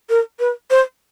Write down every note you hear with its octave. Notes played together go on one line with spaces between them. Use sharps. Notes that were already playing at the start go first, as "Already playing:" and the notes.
A#4
B4
C5